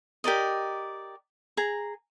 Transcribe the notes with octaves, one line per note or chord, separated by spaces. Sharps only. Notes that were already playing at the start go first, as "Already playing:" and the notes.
G4 A#4 D5 D#5
G#4 A#5